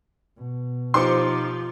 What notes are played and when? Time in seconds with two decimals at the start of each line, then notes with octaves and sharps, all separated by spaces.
0.37 B2
0.94 F3 D#4 G4 C5 C6 D6 C#7